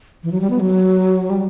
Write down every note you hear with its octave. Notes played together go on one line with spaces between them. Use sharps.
E3
F#3
G3
B3
F#3
G3